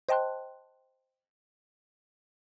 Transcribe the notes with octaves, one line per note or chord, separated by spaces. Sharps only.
C5 D#5 G5 A5 C6 F#6